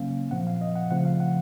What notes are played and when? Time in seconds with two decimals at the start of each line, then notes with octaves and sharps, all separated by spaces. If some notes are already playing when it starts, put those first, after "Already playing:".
Already playing: C#3 F#3 A#3 C#4 F5
0.31 A#2 F3 C4 F#5
0.47 F5
0.61 D#5
0.75 F#5
0.91 C#3 F3 A3 C4 F#5
1.05 F5
1.20 F#5